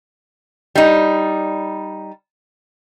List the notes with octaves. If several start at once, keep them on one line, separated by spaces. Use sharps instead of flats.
G3 D#4